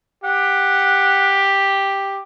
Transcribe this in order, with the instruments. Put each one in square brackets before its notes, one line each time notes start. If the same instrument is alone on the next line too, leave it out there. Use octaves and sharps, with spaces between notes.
[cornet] G4 [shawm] F#5